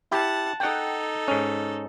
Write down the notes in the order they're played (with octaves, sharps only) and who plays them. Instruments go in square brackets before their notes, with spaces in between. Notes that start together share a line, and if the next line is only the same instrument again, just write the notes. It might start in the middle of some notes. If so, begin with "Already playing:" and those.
[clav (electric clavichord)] E4 G4 [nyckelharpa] F#5 A5
[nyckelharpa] D#4 A4 [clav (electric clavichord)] F#5 G5
[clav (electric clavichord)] G#2 C#4